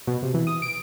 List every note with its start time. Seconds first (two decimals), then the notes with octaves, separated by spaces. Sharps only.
0.07 B2
0.23 C3
0.34 E3
0.47 D#6
0.62 D7